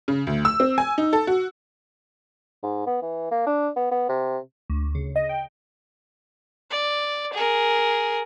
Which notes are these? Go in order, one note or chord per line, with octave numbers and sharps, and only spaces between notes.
C#3
D2
E6
C4
G#5
D#4
A4
F#4
G#2
B3
E3
A#3
D4
B3
B3
C3
D2
C#3
D#5
G5
D5
G#4 A#4